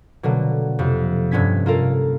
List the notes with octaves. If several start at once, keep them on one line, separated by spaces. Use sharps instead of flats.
B2 D3 F#3 A#3
F2 C3
G2 C3 B3 C#4 G#6 B6
A#3 F4 A4 A#4